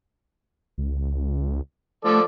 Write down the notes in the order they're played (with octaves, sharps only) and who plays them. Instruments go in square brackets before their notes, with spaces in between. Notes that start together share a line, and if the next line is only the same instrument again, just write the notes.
[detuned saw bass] C#2
[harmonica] F3 A4 D5 [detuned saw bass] A3